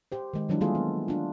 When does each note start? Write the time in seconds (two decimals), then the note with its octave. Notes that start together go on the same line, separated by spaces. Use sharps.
0.12 G4 C5
0.34 D#3 G#3
0.49 D#3 E3 F#3 G3 D4 E4
0.61 G#3 A#3 F4 G#4 A4
0.75 B3
1.08 D4 F4